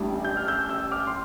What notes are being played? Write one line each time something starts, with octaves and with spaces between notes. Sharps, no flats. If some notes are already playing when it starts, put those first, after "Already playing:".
Already playing: A1 A2 G3 D4
G6
F6
E6 G6
E6 G6
D6 F6
C6